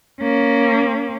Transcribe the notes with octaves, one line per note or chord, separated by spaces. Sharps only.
A#3 C#4